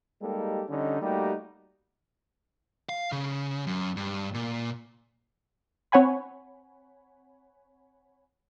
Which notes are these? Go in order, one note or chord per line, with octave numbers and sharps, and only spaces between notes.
G3 G#3 A#3 D#4 G4 A4
D3 G3 C#4 D#4
G3 A3 A#3 D#4 F#4 G4
F5
C#3
F#2
G2
A#2
C4 C#5 F#5 G#5 B5